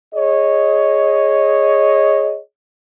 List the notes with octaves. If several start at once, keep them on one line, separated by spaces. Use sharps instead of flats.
G#4 C#5 D#5